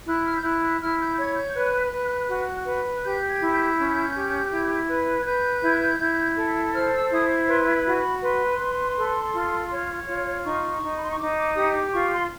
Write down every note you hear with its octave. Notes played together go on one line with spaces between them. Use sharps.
E4 F#6
F6
G6
E4 F#6
F#6
E4 F6
G6
C#5 G#6
G6
B4 F#6
B4
F#4
B4
G4 G6
G#6
E4
G6
C#4
G4
E4
B4
G#6
B4 G6
E4
E4
A4
C5 F6
E6
E4 D#6
B4 C6
B5
F#4
B5
B4 C6
B4
A4
F4
C#5
F4
D#4 C#6
D#4
B5
C6
C#6
D#4 D6
D6
G4 D#6
D6
F4 C#6
C6